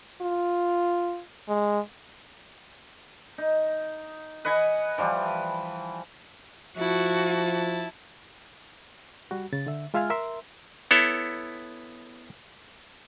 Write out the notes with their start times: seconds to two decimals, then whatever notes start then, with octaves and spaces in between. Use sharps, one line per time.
0.22 F4
1.49 G#3
3.38 D#4
4.45 B4 D#5 F#5 G#5
4.98 E3 F3 G3
6.78 F3 E4 F#4 A5
9.31 G3 F#4
9.53 C#3 A6
9.67 D3 E5
9.94 G#3 F4 E5 F5 G#5 F6
10.10 A#4 E5 C6
10.91 B3 E4 A4 C#5